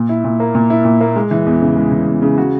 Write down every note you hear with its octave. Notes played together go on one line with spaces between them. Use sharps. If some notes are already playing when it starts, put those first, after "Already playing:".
Already playing: A#2
E4
A#2
A#3
A#2
E4
A#2
A#3
G#3
E3
E2
C#3
G#3
E3
E2
C#3
F#4